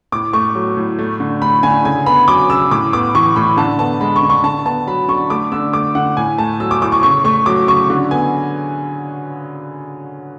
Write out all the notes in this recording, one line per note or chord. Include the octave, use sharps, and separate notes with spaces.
A2 D6
A3 C#6
F#3
A2
A3
D3
A3 B5
D3 G#5
C#3 G#5
B3 B5
F#3 D6
C#3 E6
A2 D6
B3 D6
E3 C#6
A2 B5
D3 A5
B3 A5
G#3 B5
C#6
D3
C#6
D3 A5
B3 A5
F#3 B5
D3 C#6
A3 D6
D3 E6
A3 D6
D3 F#5
A2 G#5
A3 A5
F#3 E6
D6
A2 D6
C#6
C#3 C#6
A3 C#6
F#3 D6
C#3 C#6
D3
B3 G#5